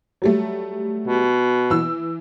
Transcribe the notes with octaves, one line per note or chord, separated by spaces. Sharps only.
F#3 G3 A3
B2
E3 E6